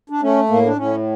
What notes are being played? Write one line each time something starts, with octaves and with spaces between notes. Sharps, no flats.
D4
A3 C#4
A2 A#3
D4
A2 C#4